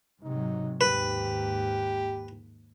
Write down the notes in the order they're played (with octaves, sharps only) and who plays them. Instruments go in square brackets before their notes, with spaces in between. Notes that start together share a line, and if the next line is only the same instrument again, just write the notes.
[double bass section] G#2 C3 F#3 [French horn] D#4
[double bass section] D#2 G#2 [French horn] G4 [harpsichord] B4